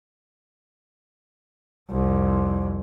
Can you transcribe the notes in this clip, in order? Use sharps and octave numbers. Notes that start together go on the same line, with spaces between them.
C2 F2